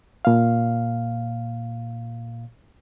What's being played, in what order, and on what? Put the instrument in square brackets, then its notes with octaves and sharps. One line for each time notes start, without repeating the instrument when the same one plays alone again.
[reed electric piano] A#2 F5